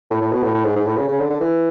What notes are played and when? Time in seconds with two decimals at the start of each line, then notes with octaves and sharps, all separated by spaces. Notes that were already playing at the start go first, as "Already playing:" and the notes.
0.10 A2
0.21 A2
0.32 B2
0.43 A2
0.54 A2
0.65 G#2
0.76 G#2
0.87 A2
0.97 C#3
1.08 C#3
1.19 D3
1.30 D3
1.40 E3